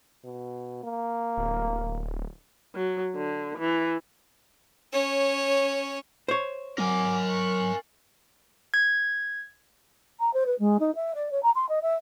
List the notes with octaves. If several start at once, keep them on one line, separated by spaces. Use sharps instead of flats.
B2
A#3
D1
F#3
D3
E3
C#4 C#5
C5 C#5
F#3 F#4 A#4 G#5 D6
C#6 F#6
G#6
A#5
C5
B4
G#3
D#4
E5
D5
C#5
A#5
C6
D#5
E5